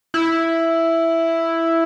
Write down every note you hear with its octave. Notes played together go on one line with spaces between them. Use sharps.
E4